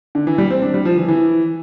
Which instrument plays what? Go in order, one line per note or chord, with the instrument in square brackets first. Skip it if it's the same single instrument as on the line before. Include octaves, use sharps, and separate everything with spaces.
[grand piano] D3
E3
G3
C4
D4
G3
F3
E3
E3